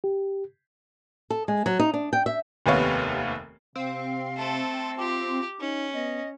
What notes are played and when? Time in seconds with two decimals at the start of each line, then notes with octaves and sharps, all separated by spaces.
0.04 G4
1.30 A4
1.48 G#3
1.66 F#3
1.79 D#4
1.94 D4
2.13 G5
2.26 E5
2.66 F1 D#2 C3 B3 C#5 F5
3.75 C3 C4 F5
4.36 A3 A4
4.98 F4 G4 D6
5.60 C#4 D#4
5.94 B3 D#5